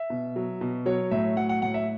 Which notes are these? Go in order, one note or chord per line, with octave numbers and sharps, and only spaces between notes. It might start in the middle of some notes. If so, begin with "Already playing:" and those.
Already playing: E5
B2
F#3
B2
F#3 C#5
A2 E5
F#3 F#5
F#5
A2 F#5
E5